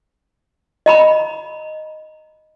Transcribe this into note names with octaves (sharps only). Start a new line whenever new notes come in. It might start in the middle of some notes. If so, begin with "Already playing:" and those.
D#5 A#5 B5